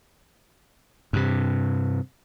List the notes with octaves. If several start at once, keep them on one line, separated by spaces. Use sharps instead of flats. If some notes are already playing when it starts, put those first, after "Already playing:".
G2 C3